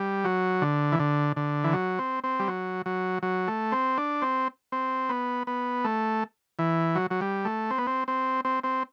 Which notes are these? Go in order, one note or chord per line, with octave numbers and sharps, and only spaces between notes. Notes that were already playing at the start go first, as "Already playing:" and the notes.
Already playing: G3
F#3
D3
E3
D3
D3
E3
F#3
C4
C4
G3
F#3
F#3
F#3
A3
C4
D4
C4
C4
B3
B3
A3
E3
F#3
F#3
G3
A3
C4
B3
C4
C4
C4
C4